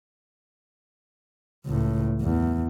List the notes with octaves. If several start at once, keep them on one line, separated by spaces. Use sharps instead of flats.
C#2 A2
E2